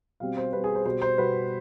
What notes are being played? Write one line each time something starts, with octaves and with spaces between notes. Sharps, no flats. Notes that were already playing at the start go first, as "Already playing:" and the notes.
B2 G3 C4 F5
C5
B2 G3 C4 B4
G#4
C5
B2 G3 B3 C5
C5
B2 G3 B3 B4